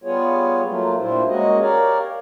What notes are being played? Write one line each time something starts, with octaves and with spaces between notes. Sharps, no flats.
G3 B3 F4 G#4 C#5
F#3 A3 A#3 F4
A#2 G3 D4 E4 F4 C5
G#3 A#3 C#4 F#4 G#4 D#5
G4 A#4 C#5 D5 F5